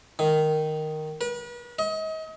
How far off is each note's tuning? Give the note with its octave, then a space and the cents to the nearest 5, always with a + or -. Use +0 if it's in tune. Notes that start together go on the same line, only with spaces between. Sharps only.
D#3 -5
B4 -40
D#5 +35